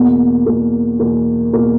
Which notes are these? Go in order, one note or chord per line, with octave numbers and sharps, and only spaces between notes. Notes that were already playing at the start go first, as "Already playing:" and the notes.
Already playing: E2 B2 A#3
E2 B2 A#3
E2 B2 A#3
E2 B2 A#3